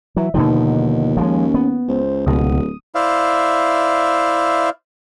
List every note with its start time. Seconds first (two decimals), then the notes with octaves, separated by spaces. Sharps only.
0.17 E3 F#3 E5
0.34 D#2 B2 D3 F3 D#4
1.17 F3 G3 G#3 C#4
1.54 B3
1.88 C#2 C5
2.26 D1 C#2 B2 D#6
2.95 E4 C5 D5 E5 F5